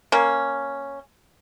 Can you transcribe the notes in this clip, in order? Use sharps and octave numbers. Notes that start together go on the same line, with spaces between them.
A#3 C#4